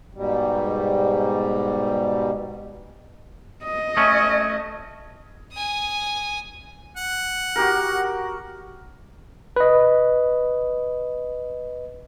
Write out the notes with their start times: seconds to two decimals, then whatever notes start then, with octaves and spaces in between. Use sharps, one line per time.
0.15 G#2 B2 G3
3.64 D#5
3.97 A3 C#4
5.53 G#5 D#6
6.97 F#5
7.56 F#4 G4 A#4
9.56 B4 D#5